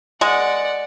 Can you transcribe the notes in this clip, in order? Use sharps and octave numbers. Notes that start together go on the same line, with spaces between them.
G#3 D5 F#5